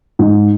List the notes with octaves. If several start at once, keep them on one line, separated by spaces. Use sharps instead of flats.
G#2